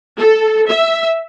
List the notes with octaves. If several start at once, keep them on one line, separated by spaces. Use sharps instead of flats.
A4
E5